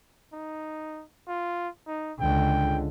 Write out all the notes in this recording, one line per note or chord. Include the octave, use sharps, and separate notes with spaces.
D#4
F4
D#4
C#2 D3 G5